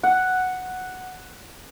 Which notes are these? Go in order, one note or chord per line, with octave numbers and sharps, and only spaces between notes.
F#5